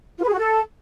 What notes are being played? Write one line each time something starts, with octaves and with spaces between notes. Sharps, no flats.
F4
B4
G#4
F#4
A4